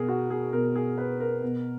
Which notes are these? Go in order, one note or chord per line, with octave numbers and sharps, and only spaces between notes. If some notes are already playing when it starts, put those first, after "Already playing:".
Already playing: B2 G#4 A#4
F#4
G#4
B2 A#4
G#4
B4
A#4
B2